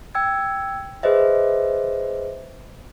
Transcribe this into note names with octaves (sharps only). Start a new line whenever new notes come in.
G5 E6 G#6
G#4 B4 C5 D#5 E5